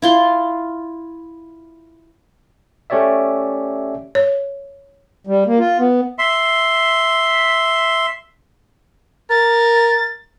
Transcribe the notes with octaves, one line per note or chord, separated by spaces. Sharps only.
E4 F4 C6
A3 C#4 G4 C#5 D5 E5
C#5
G3
A#3
F4
B3
E5 C6
A#4 A6